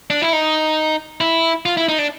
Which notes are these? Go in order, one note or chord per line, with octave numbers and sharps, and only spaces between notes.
D4
E4
D#4
E4
F4
E4
D#4
D4